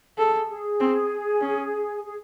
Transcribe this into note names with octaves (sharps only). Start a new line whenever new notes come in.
G#4 A4
G#4
C4
C#4
G#4